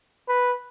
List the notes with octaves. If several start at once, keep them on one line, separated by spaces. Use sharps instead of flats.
B4